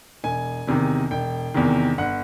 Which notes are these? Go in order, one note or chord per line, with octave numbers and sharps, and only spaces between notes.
E1 G#5
E2 C3 D#3
E1 G5
E2 C3 D#3
G1 F#5